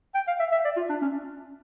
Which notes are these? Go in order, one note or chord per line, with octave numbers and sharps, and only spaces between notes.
G5
F5
E5
E5
D5
F4
D4
C#4